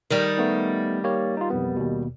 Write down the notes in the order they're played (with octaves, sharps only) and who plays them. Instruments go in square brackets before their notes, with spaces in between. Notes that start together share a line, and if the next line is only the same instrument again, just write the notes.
[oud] D#3 G3
[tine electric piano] A3 B3 D#4
A#3 G4 C#5
D#4 F4
B1 F2 B3
D#2 B2